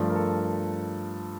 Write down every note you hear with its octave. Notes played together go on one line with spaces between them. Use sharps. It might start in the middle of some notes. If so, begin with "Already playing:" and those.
Already playing: G2 F3 A3
A#4
A4